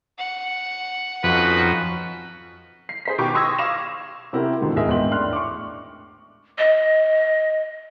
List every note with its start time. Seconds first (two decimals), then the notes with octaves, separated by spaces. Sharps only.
0.18 F#5
1.24 F2 C#4 D#4 F#4 B4
2.89 C7
3.05 G#4 C5 B6
3.18 B2 D#3 G4 G5 C#6 D6
3.35 C6 C#6 D#6 E6 G#6 A#6
3.58 F5 C#6 D6 A#6 E7
4.33 C3 C4 E4 F#4 G4 A#4
4.61 G#2 B2 D3 D#3
4.76 D1 G#1 G#4 A#4 D#5 E5
4.88 G#1 E2 G5 C6 F#7
5.11 A2 D4 C6 F6 F#6
5.33 C#6 D6
6.58 D#5